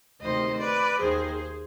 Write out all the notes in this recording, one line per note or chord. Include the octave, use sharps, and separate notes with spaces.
D2 C3 D#3 C5 D#5
B4 D5
D#2 D#3 G#4 C5